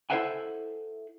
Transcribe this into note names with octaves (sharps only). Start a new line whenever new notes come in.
E4 A4 C5 E5 F#5 G#5